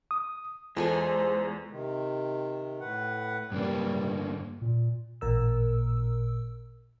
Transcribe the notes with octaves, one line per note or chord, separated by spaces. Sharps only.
D#6
E2 G#3 F4 A4 C5 G#5
C3 D#3
A2 B4 F#5
G2 D3 G3 A#3
A#2
A1 A#2 A#4 E6